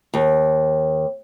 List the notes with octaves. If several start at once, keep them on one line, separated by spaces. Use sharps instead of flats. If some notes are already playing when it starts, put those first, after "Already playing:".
D#2